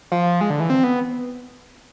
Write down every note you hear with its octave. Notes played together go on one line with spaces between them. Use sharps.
F3
G#3
D3
E3
C4
B3